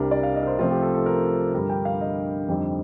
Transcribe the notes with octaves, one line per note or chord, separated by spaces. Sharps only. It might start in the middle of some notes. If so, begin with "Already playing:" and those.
Already playing: C2 C3 G3 D4 A#4
D5
F5
D#5
A#4
C5
C3 F3 A3 C4 F4
G4
A4
A4
A#4
G2 D3 G3 A#4
G5
F5
D#5
F2 D3 G3 C4 D#4